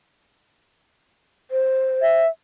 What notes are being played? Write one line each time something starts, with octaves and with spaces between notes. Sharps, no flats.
C5
E5